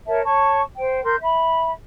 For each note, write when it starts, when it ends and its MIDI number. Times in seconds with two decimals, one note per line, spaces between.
0.07 0.21 70
0.07 0.21 73
0.07 0.21 76
0.07 0.21 81
0.24 0.61 73
0.24 0.61 81
0.24 0.61 85
0.77 1.02 72
0.77 1.02 79
1.04 1.16 70
1.04 1.16 84
1.04 1.16 91
1.21 1.72 76
1.21 1.72 83